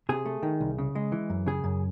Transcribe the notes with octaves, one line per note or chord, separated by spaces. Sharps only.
C3 G#4
A3
D#3
C2
C#3
G#3
E3
F#2
C#3 G#4
F#2